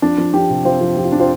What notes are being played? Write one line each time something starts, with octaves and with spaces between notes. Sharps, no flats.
F3 D4
F3
F3 D4 G4
C3
F3 C4 F4
F3
F3 G4
F4
F3 D4
C4 F4